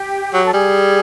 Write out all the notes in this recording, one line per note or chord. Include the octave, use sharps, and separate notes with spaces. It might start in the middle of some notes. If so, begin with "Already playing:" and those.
Already playing: G4
F#3
A4
G3 G#4